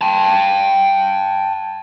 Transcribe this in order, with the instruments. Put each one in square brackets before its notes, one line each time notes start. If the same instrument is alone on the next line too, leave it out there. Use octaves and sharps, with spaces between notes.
[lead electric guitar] G5 A5